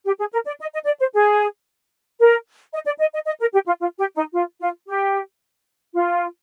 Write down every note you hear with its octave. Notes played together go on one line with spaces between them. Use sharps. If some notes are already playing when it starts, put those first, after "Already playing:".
G4
G#4
A#4
D5
D#5
D#5
D5
C5
G#4
A#4
D#5
D5
D#5
D#5
D#5
A#4
G4
F4
F4
G4
D#4
F4
F4
G4
F4